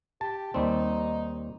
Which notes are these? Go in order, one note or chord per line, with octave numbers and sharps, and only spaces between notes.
G4 A5
D#2 G3 C4 D#4